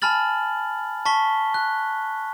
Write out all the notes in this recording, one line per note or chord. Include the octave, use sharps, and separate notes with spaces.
G#5 A5 B5 F6 A6 F#7
A5 C#6 B6 G7
F#6